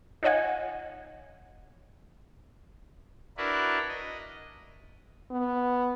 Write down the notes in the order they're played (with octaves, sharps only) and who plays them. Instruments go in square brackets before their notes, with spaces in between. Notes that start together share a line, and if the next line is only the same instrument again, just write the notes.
[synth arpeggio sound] D#4 F4 C#5 D#5 F#5 G#5
[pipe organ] D4 E4 F#4 A#4 B4
D#5
[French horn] B3